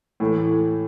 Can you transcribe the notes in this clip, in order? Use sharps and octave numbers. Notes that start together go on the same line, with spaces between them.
A2 E3 A3